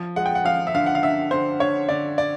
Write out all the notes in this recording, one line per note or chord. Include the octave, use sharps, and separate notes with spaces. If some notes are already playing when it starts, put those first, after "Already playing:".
Already playing: F3
G#3 F#5
G5
F#5
F3 F5
E5
D3 F5
F#5
F5
D3 E5
D3 C5
D3 C#5
D3 D5
D5